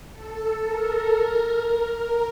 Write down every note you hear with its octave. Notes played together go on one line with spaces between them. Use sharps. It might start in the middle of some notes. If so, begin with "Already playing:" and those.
A4
A#4
A#4